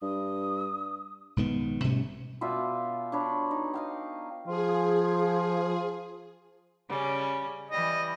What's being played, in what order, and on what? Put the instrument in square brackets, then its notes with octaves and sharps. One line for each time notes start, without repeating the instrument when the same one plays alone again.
[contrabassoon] G2 [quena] D#6
[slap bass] B1 G#2 D#3 B3
B2 G3 A3 C#4
[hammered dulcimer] B2 F4 D5 E5
D4 C#5 B5
D#4
D#5 F5 G5
[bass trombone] F3 [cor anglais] F4 [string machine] G#4
[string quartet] C#3 G3 C#4
[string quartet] E3 G3 [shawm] D#5